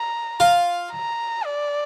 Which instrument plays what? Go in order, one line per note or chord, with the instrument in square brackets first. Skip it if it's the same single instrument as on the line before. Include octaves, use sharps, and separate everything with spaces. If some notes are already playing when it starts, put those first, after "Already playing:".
Already playing: [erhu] A#5
[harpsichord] F4
[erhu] A#5
D5